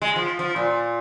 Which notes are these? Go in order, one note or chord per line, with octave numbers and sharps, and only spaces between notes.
G#3
F3
F3
A#2